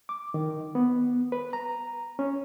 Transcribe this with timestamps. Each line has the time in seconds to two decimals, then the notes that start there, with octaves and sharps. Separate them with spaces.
0.09 D6
0.34 D#3
0.75 B3
1.32 B4
1.53 A#5
2.19 C#4